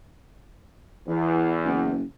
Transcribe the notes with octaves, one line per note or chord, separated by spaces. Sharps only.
E2 E3
F#1